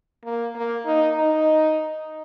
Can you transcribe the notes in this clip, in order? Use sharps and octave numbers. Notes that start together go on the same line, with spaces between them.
A#3
A#3
D#4
D#4